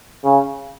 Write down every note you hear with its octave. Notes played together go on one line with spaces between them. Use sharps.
C#3